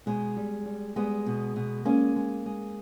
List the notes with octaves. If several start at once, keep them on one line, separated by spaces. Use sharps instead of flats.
B2 G#3
G3
G3
G3 G#3 B3
B2
B2
G#3 A#3 C#4
G#3
G#3